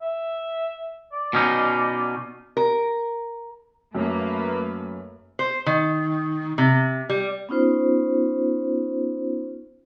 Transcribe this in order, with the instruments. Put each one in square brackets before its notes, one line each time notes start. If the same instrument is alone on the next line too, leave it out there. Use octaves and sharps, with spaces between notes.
[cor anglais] E5
D5
[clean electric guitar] B2 C#4 D#4
[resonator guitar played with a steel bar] A#4
[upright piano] F#2 [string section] A3 A#3 B4
[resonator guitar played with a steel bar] C5
D#3
C3
G3
[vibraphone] B3 C#4 D#4 F4 C5